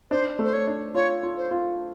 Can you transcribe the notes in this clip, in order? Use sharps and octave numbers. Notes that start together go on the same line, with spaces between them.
D4 C5
A3
C5
C#5
D4
F4 C#5
F4
C5
F4